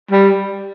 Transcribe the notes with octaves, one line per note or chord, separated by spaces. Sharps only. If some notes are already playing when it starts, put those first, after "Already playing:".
G3